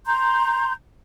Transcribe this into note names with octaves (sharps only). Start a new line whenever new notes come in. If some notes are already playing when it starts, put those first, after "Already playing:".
A#5 C6 G6